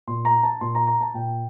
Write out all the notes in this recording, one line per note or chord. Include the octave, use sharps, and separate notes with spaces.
A#2 C6
A#5
A5
A#2 C6
A#5
A#5
A5
A#2 G5